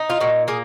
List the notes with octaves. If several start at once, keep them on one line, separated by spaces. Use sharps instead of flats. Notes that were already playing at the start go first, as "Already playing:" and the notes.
Already playing: D#4
F4
A#2 F#4
A#3 G#4